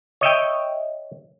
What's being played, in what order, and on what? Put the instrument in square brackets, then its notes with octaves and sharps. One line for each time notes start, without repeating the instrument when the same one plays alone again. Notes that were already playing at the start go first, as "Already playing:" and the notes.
[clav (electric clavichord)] C#5 D#5 E5 G5